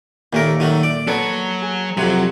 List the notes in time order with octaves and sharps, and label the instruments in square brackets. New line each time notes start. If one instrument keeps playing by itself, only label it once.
[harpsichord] D#2 A3 A#4 [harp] A#2
[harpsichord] D#3 F#3 A3
D5
[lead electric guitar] F#3 C#5 [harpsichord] B3 [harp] A4 A#4
[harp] G#4
[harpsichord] F2 C3 [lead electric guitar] F#3